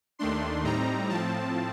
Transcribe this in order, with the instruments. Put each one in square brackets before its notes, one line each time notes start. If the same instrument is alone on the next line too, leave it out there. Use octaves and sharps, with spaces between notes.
[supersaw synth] D#2 D#3 A3 D4 C6
A2 G3 C4 D#4 A#5
A2 F3 C4 A5